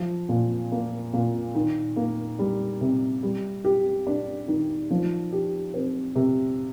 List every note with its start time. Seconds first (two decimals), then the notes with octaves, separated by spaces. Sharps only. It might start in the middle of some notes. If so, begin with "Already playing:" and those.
Already playing: F3
0.29 A#2
0.72 A#3
1.13 A#2
1.55 D#3
1.96 A#3
2.39 G3
2.81 C3
3.23 G3
3.64 G4
4.07 D4
4.48 D#3
4.91 F3
5.32 G4
5.74 C4
6.16 C3